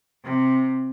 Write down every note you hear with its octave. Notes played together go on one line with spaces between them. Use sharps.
C3